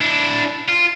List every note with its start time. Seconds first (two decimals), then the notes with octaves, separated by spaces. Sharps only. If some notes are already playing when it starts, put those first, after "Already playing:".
0.01 D4 E4
0.68 F4